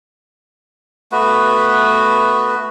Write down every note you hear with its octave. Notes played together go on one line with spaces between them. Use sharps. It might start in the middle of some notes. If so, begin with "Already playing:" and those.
A3 B3 F#4 B4